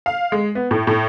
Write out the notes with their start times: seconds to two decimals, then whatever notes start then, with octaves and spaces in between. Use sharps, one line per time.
0.06 F5
0.32 G#3
0.55 B3
0.71 A2
0.87 A2